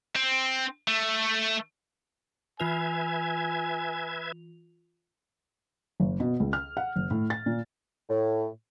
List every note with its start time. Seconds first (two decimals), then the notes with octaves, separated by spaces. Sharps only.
0.15 C4
0.88 A3
2.60 E3 F4 B4 E5 G#5 G#6 F7
6.00 F#1
6.20 B2
6.40 C#2
6.53 F6
6.77 F#5
6.96 F#1
7.10 A2
7.30 A6
7.46 A#2
8.10 A2